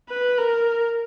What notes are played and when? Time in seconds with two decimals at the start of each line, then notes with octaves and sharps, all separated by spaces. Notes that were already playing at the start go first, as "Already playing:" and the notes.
0.09 B4
0.38 A#4